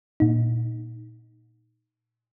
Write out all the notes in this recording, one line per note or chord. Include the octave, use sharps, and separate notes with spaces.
A#2 D#4